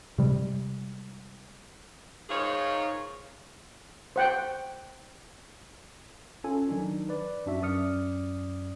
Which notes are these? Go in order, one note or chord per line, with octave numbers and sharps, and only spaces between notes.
C3 G3 G#3
G#2 D#3 F4 G#4 C#5
C5 F#5 G5
C#4 F4 A4 G#5
D#3 F#3 D4 D#4
B4 D5
F#2 D4 F#4 E5
F#2 D5 D#6 F6 C#7